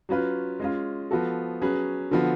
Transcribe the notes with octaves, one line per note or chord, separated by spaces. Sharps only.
F#3 C#4 F4 B4
G#3 C#4 F4
F3 B3 F#4 A4
F#3 C#4 G#4 B4
D3 F3 B3 F#4